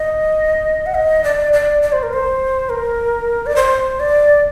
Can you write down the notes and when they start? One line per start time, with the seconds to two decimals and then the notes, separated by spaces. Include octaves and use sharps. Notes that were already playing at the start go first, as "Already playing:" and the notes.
Already playing: D#5
0.86 F#5
0.95 D#5
1.24 D5
1.53 D5
1.82 D5
1.92 C5
2.03 A#4
2.13 C5
2.69 A#4
3.46 D5
3.56 C5
4.00 D5